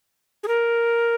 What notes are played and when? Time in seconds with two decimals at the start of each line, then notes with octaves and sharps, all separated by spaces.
0.43 G#4
0.48 A#4